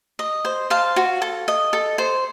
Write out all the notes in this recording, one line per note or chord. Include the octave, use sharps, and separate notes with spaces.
D#5
C5
C5 F5 A5
F#4
A4
D#5
A4
C5